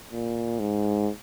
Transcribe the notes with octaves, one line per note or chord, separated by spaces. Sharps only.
A#2
G#2